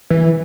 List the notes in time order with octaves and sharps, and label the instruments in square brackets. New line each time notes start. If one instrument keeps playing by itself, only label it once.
[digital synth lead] E3